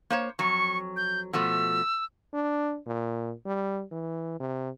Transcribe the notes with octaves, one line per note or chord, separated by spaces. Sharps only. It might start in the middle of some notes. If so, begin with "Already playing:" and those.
A#3 C5 C#5
F2 F#3 C#6
G6
B2 F3 A3 E6
D4
A#2
G3
E3
C3